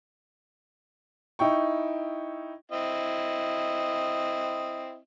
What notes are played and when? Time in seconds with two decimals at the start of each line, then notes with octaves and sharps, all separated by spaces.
1.39 D#4 E4 G5 C#6
2.72 C4 E4 D#5